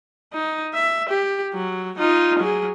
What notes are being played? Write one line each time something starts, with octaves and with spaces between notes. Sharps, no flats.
D#4
E5
G4
F#3
D#4 F4
F#3 G#4